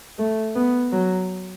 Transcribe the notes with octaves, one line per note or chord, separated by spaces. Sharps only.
A3
B3
F#3